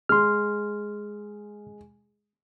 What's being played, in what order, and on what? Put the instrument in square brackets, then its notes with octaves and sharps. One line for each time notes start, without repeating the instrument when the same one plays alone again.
[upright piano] G#3 [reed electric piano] C6 F6